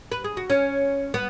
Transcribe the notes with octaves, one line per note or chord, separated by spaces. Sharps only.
B4
G#4
F#4
C#4
B3